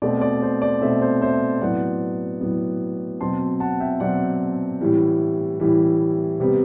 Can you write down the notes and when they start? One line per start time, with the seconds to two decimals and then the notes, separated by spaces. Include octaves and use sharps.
0.02 B2 A3 C4 D5
0.21 D5
0.42 C5
0.62 D5
0.81 B2 A3 C4 C5 E5
1.01 C5 E5
1.21 C5 E5
1.61 A2 F#3 B3 D5 F#5
2.41 A2 F#3 B3
3.20 B2 F#3 C4 A5 C6
3.60 F#5 A5
3.80 E5 G5
4.00 B2 F#3 C4 D5 F#5
4.81 A2 E3 G3
5.60 A2 E3 G3
6.40 C3 G3 B3